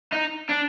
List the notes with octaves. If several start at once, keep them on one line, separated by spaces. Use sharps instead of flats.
D#4
D4